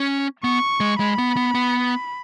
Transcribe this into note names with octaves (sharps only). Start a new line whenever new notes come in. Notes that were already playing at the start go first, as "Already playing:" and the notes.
Already playing: C#4
B3 C#6
G#3
G#3 B5
B3
B3
B3